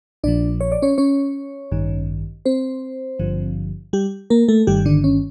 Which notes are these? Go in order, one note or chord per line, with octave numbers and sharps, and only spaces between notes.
A#1 A#2 F3 D4 D5
C#5
D5
C#4 C#5
C#4 C#5
A1 G2 D#3
C4 C5
G#1 G2 D3 F3
G3 G4
A#3 A#4
A3 A4
G1 G2 D#3 G3 G4
D3 D4
C#4